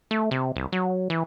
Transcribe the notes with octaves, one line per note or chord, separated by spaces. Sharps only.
A3
C3
C2
F#3
E3